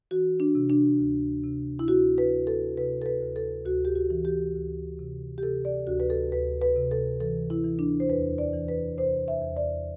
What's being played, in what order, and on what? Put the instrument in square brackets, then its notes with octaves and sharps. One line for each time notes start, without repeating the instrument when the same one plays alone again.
[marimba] E3 F#4
D4
C3
D4
D2
C3
E4
D2 F#4
B4
D2
A4
C3 B4
A4
B4
D2
A4
D2 F#4
G4
F#4
E3
G4
D2
C3
G4
C3 A4
D5
D2 F#4
B4
A4
D2 B4
B4
C3
A4
E3 A4
E4
E3
D4
C5
E2 B4
D5
E3
B4
C3 C5
E5
E2
D5